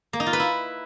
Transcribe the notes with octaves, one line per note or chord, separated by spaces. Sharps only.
A#3
D#4
F4
B4
E4